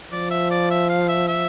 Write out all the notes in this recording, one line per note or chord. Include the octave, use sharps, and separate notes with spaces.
F3 D5
E5
D5
E5
F5
E5
E5